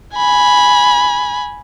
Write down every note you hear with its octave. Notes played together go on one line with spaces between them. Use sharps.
G#5 B5